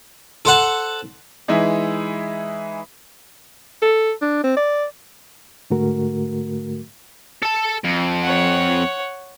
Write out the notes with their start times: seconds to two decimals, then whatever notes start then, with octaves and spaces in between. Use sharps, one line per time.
0.45 A4 C5 F#5 A5
1.48 E3 G#3 D#4 E4
3.82 A4
4.21 D4
4.44 C4
4.57 D5
5.70 G#2 D3 A3 F#4 A#4
7.42 A4 A5
7.84 F2
8.23 C#5 F#5